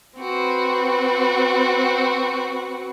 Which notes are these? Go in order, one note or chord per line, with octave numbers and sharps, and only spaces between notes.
C4 F#4 B4